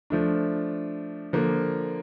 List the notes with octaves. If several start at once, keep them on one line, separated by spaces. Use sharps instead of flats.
F3 A3 D4
D3 F3 A#3